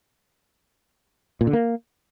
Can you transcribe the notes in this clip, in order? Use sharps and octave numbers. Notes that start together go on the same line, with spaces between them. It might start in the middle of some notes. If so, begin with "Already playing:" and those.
A#2
D3
A#3